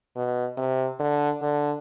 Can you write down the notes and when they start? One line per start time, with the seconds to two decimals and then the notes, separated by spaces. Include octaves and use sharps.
0.16 B2
0.57 C3
1.00 D3
1.42 D3